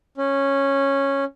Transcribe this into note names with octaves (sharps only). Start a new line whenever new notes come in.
C#4